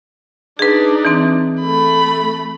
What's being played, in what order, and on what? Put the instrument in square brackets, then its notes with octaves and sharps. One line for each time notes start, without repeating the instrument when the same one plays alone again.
[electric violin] D4 D#4 [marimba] G#4 B4
[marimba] E3 C4
[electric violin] A3 B5